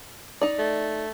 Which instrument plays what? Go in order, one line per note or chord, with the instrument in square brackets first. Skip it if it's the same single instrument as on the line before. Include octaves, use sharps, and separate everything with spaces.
[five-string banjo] D#4 D5
[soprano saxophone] A3